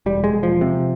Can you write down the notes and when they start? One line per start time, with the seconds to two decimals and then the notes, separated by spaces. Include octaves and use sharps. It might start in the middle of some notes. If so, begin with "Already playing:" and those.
0.06 E1 G3
0.24 G#3
0.33 E1
0.43 F3
0.61 C3